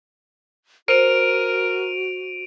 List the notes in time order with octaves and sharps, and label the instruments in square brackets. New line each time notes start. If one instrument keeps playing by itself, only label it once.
[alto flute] F#4 [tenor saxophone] A#4 [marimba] C5 [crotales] D7 D#7 F7